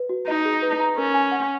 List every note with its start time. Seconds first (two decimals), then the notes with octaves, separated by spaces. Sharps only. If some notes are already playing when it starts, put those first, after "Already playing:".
Already playing: B4
0.09 F#4
0.27 D#4 D#5
0.45 G#4
0.63 B4
0.80 A#5
0.97 C#4 A#4
1.14 G#5
1.31 F#5